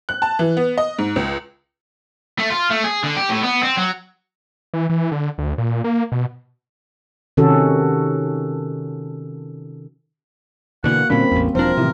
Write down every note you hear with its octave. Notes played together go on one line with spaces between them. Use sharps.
F#6
A5
E3
B3
D#5
G#2
C#2
A3
F4
A3
G#4
D3
G4
A2
B3
C4
F#3
E3
E3
D3
D2
A#2
A#3
B2
C3 D#3 C#4 F#4 A4
B2 D3 E3 A#3 F#4 F#5
A#2 D3 G3 A#3 C4 C#4 B5
A1 E2
E1 F3 C4 D4 F4 A#4 C5
A2 C3 E3